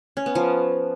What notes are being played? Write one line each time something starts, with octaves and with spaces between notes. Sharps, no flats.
C#4
B3
F3